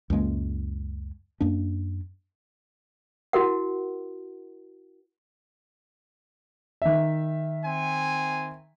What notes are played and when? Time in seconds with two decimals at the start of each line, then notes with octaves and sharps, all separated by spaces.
0.10 C#2 F#2 G#3 A#3
1.40 F#2 A#3 D4
3.33 E4 F#4 A#4 F#5
6.82 D#3 E5
7.65 C4 G#5